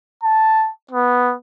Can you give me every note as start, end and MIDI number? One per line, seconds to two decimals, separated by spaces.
0.23 0.70 81
0.91 1.34 59